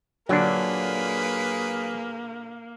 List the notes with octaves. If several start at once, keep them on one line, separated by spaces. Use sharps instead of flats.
A#2 D3 F#3 A#3 D4 G#4 B4